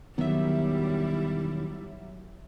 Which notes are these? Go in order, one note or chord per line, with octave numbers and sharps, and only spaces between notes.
E1 D#3 F#3 G3 B3 E4 E5